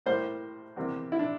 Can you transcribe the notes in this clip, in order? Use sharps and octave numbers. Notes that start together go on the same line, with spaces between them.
A2 G3 A#3 C5
E2 C3 G3 A#3
E4
D4